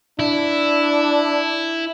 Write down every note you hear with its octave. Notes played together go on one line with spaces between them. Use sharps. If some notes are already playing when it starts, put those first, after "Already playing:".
D4 E4